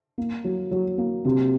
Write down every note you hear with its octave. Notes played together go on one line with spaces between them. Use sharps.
A#3
F#3
F#3
A#3
C3